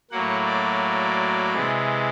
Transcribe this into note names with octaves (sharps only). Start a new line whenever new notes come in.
A2 F#3 A#3 F#5
D5
C3 E3 G#3